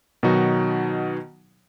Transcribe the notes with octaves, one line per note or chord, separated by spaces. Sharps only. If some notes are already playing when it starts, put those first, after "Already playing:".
B2 D#3 F#3 D#4 F#4